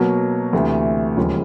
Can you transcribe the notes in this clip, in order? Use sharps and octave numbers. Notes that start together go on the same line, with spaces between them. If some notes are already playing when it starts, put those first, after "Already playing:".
Already playing: B2 F#3 A#3
D2 C3 E3 A3
D#2 C#3 F3 G#3